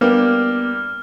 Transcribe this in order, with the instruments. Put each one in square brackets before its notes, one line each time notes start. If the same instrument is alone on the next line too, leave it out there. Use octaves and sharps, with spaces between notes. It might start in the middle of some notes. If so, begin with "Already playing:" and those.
[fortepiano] G3 A#3 D4 [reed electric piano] B3 [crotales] F6